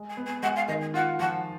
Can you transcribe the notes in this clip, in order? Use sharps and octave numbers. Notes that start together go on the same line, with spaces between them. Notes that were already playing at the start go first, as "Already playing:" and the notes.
Already playing: G#3
G#5
B3
G#5
G#3 F#5
F5
D#3 D#5
G#5
F4 F#5
F3 F#5